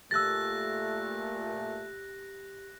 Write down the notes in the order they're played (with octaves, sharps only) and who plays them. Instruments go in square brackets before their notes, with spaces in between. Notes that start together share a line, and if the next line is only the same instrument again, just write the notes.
[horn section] A#2 A3 [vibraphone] G4 [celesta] E6 A6 [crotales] F#6 A#6